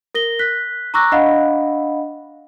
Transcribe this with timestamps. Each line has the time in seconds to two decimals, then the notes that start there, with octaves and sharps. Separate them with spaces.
0.15 A#4 A#6 G7
0.39 F#6 B6
0.94 A#5 C#6 D6 E6 F#6 A#6
1.12 D4 D#5 F5 F#5 B5